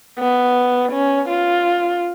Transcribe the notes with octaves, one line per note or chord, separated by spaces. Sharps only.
B3
C#4
F4